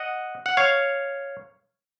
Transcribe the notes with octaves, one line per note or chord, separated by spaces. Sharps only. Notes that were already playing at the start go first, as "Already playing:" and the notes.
Already playing: D#5 F#5
F#5
C#5 F5